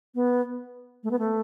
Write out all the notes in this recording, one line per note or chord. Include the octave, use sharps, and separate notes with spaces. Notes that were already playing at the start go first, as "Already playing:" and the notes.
B3
A3
B3
A3